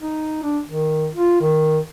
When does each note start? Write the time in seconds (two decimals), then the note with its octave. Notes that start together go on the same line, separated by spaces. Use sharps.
0.02 D#4
0.43 D4
0.67 D#3
1.15 F4
1.41 D#3